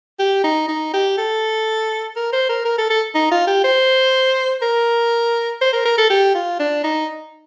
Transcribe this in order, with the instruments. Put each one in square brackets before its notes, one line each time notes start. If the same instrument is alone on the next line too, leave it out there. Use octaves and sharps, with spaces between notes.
[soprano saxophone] G4
D#4
D#4
G4
A4
A#4
C5
A#4
A#4
A4
A4
D#4
F4
G4
C5
A#4
C5
A#4
A#4
A4
G4
F4
D4
D#4